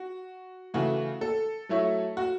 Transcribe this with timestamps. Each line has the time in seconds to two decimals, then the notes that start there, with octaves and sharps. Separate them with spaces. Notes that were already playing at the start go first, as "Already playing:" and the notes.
Already playing: F#4
0.74 C#3 E3 A3 F#4
1.21 A4
1.69 F#3 A3 E4 C#5
2.17 F#4